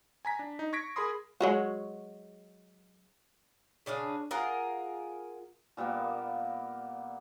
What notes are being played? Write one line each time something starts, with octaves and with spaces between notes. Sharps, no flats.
G#5 A#5 B6
D4
D#4
C#6 G#6 A#6 B6 D7
G#4 A#4 B5 C6 D#6
F#3 G#3 F#4
C#3 D4 G#4 F5
F4 G#4 A#4 F#5
A#2 G3 A#3 B3